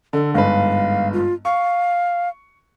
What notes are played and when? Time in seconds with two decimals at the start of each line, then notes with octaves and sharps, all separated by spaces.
0.13 D3 A4
0.34 G1 G#2 B4 F5
1.13 F4
1.45 F5 C#6